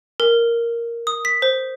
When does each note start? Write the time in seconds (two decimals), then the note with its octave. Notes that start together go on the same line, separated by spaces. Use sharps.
0.20 A#4
1.07 D#6
1.25 B6
1.42 C5